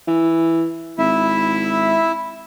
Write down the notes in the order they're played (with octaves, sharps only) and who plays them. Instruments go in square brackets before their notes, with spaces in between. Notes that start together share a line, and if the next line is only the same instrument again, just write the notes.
[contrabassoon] E3
[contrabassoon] G#1 [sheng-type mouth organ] E4 E5